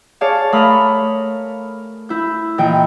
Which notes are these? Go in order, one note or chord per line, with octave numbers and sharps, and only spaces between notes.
G#4 C#5 D5 F5 A5
A3 A#4 F5 B5 D#6
E4 G6
A#2 E3 D#5 G5